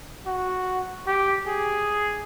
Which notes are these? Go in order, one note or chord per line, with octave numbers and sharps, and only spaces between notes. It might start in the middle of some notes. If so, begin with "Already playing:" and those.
F#4
G4
G#4